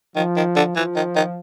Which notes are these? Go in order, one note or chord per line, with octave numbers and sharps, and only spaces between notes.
D#3 F3
D#3
D3
E3 F3
D#3
D#3